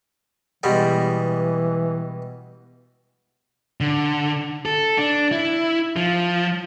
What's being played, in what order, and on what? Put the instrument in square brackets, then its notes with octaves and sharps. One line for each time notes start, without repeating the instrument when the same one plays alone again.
[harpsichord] B2 G3 G#3 [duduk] E3
[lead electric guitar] D3
A4
D4
E4
F3